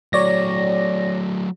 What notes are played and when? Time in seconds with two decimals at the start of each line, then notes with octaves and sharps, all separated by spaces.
0.13 F#3 A3 C#5 D5 A#6